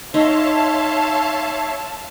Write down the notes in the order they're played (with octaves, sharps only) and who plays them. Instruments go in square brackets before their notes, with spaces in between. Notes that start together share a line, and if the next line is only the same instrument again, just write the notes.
[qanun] D#4 [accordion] C#5 E5 C6 [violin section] F5 A5